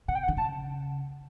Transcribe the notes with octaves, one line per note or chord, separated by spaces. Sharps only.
C3 F#5
G5
F#5
D3
C#3 A5